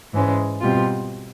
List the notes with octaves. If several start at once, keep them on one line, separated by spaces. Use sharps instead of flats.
G#2 E3 G#3 C#4
B2 G3 C4 F4